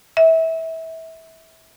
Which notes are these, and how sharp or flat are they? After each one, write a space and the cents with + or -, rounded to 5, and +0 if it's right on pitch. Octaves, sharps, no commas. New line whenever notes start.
E5 -25